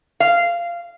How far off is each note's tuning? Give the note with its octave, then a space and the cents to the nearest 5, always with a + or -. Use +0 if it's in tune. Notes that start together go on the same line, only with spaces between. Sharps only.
F5 -15